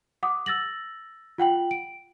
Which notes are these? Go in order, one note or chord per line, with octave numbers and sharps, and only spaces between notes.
F#5 D6 D#6
E6 A6 A#6 F#7
F4 F#5 G5 F#7
D7